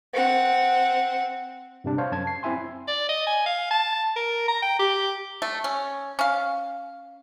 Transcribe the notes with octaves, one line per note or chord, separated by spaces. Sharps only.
C4 F#5
G2 C3 D4
C5 C#5 F5
F#2 A5 G#6
C7
C4 E4 E5 G#5 C6
D5
D#5
G#5
F5
A5
A#4
A#5
G5
G4
A3
C#4
C#4 F5